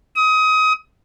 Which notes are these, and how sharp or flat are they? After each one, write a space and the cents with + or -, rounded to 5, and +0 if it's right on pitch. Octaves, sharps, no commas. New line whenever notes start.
D#6 +25